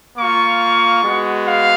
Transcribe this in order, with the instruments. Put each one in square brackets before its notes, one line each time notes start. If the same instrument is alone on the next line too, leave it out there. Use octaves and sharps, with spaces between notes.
[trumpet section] A#3 F4 C#6
G#3 B3 F#4
F5